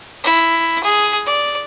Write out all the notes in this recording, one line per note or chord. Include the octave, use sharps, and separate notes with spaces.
E4
G#4
D5